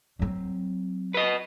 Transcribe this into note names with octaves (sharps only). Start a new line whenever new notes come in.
F#3 C4
B4 D#5